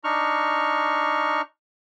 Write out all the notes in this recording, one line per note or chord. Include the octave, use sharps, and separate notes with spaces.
D4 D#4 C#6 F6